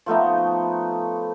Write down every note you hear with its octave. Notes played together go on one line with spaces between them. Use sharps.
F3 A3 B3 D#4